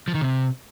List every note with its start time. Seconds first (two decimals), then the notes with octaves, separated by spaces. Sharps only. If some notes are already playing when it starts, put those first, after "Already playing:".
0.08 F3
0.14 D#3
0.21 C3